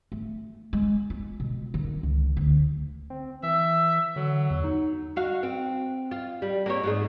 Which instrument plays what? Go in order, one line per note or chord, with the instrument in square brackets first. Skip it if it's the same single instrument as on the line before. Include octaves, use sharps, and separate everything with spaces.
[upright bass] A3
G#3
F4
B2
D#3
C#2
D2
[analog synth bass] C4
[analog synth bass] E3 [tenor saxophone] E5
[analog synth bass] D3 [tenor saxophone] F#3
[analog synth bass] E2
D#4
[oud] F#4 F5
C4
F4
G3
A#3 C4 C#5
G#2 A3 G#4